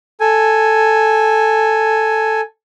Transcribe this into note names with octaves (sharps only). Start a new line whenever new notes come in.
A4 G#5